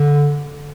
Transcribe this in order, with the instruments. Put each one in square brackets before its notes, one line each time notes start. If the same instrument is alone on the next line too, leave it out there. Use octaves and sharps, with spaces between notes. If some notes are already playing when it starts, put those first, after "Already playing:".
Already playing: [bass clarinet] D3